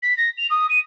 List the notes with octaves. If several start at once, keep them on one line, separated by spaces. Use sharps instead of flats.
B6
A#6
F7
D#6
D#7